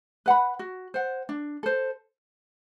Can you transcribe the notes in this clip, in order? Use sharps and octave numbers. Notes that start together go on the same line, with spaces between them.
B4 F#5 B5
F#4
C5 F#5
D4
A4 C5